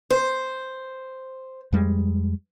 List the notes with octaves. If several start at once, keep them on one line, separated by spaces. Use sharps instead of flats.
C5
F2 G3 G#3